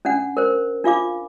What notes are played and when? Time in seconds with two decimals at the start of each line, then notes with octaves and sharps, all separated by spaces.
0.05 C#4 D4 F#5
0.37 A#4 C5
0.84 D4 F4 F5 D6